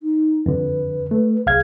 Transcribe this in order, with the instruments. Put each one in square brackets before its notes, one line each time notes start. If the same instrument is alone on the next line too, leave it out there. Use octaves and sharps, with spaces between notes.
[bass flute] D#4
[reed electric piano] F2 D3 [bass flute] B4
[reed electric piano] A3
[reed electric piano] C2 F5 G#6 [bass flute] G#4